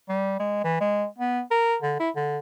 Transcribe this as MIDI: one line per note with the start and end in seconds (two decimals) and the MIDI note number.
0.09 0.39 55
0.40 0.61 56
0.64 0.77 52
0.80 1.05 56
1.18 1.41 59
1.51 1.76 70
1.82 1.95 50
1.99 2.10 64
2.16 2.38 50